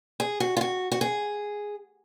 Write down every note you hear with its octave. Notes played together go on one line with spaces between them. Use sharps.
G#4
F#4
F4
F#4
F#4
G#4